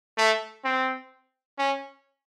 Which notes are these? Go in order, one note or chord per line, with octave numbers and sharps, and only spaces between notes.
A3
C4
C#4